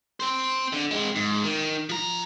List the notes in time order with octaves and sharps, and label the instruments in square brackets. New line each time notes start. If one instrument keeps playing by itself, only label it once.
[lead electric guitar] C4 C5
D3
G#3 C4
G#2
D#3
F3 A#5